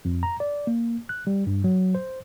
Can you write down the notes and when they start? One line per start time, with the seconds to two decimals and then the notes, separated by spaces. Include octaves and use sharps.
0.05 F2
0.23 A#5
0.40 D5
0.67 A#3
1.09 F#6
1.27 G3
1.47 G2
1.64 F#3
1.95 C5